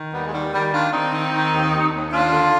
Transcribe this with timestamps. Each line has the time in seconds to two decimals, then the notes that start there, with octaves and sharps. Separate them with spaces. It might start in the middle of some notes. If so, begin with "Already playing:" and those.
Already playing: D#3
0.13 D#2 G3 B3
0.27 G#3
0.33 D#3 G3
0.53 D#3 G3
0.73 D#3 D4 F4
0.92 D#3 C4 D#4
1.13 D#3
1.33 D#3
1.52 D#2
1.73 D#2
1.93 D#2
2.12 D#2 D4 F4
2.32 D3